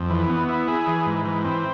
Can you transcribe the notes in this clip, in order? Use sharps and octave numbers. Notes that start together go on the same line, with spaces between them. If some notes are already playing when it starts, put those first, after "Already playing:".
Already playing: F2
E3
B3
E4
G#4
E3
G#2
E3
C4